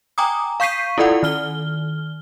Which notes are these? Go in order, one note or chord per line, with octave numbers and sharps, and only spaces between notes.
G5 G#5 A#5 D6 D#6
F5 C#6 G6 B6 C7 D#7
E4 F4 A4 D5 F#5
D#3 F6 G7